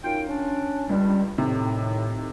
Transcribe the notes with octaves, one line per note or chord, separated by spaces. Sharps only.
F#2 D#4 F4 G5
C#4 D4
C#2 G2 G3
A2 C3 D#3